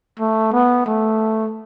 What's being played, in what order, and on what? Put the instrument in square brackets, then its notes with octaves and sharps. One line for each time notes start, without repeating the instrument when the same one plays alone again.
[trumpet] A3
B3
A3